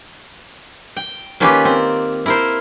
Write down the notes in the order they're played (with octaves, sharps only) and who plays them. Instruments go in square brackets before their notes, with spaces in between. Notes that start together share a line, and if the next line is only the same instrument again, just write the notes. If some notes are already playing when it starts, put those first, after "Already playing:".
[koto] G5
D#3 A#3 C#4 F4 G4 B4
C4
E4 A#4 C5